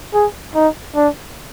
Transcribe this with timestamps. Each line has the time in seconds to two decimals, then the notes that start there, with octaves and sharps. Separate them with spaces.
0.14 G#4
0.55 D#4
0.96 D4